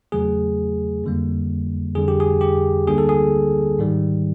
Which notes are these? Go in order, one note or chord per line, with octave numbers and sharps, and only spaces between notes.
E2 C#3 F#3 A3 G#4
F2 D3 G3 A#3
F2 D3 G3 G#4
G4
G#4
G4
D2 D3 G3 A#3 G#4
A4
G#4
G#2 D#3 G3